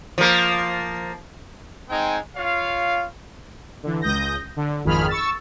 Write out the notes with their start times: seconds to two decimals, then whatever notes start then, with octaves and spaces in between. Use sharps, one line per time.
0.18 F3 A#3
1.89 G#3 C4 D#4 G5 G#5
2.36 F4 C#5 F5
3.83 D3 E3
4.02 C#2 D#6 G6 A#6
4.56 D3
4.84 G#1 F2 D#3 G#4 B5 F6
5.08 C#6 E6 A6